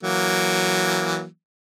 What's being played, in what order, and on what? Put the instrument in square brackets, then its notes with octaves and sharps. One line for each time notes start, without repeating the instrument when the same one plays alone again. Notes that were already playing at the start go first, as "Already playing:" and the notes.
[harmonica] E3 F#3 A#3